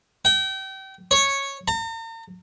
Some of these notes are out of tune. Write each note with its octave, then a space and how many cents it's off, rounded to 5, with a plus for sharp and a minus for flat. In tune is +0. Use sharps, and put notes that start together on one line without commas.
G5 -30
C#5 -5
A#5 -45